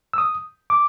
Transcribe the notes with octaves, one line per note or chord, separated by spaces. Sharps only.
E6
D#6
D6